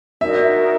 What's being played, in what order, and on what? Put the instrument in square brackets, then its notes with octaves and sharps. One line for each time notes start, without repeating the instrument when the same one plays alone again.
[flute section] D#4 F#4 A#4 D5 [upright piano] E5